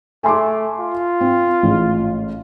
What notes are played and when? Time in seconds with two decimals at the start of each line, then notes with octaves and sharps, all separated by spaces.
0.24 A3 G#5 C6 D6
0.80 F4
1.21 C4
1.63 A1 G#2